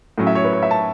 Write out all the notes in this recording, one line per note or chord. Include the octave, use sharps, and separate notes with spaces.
A2 F#3 C#4
E5
C#5
B4
C#5
E5
A5